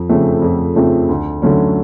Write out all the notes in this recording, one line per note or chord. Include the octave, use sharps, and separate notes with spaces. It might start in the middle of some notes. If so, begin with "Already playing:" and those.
Already playing: F2
C#3 F3 A3 C4
F2
C#3 F3 A3 C4
D2
D3 F#3 A3 C#4